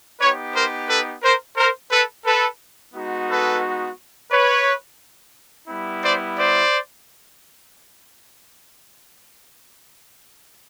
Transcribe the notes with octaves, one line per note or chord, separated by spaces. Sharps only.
B3 D#4 G4 B4 C#5
A#4 C5
A4 B4
A#4 C5
A#4 C5
A4 B4
A4 B4
G#3 B3 D#4 F#4
A4 B4
B4 C#5
G3 B3 E4
C5 D5
C5 D5